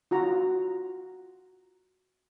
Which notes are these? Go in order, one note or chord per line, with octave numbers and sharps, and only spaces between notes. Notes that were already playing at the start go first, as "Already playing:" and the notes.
F4 F#4 A#5